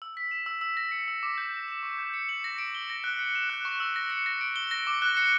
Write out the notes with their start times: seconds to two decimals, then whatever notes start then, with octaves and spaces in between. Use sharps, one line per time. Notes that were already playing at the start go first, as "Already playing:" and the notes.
0.02 E6
0.17 B6
0.31 E7
0.46 E6
0.61 E6
0.77 A#6
0.91 C#7
1.08 E6
1.23 D6
1.38 G6
1.53 A#6
1.68 E7
1.83 C#6
1.98 G6
2.14 C#7
2.29 F#7
2.44 A#6
2.58 D7
2.75 G7
2.90 A#6
3.04 F#6
3.19 C#7
3.35 E7
3.50 F#6
3.65 C#6
3.80 E6
3.96 A#6
4.10 C#7
4.26 A#6
4.41 D7
4.56 G7
4.71 A#6
4.87 D6
5.02 F#6
5.17 C#7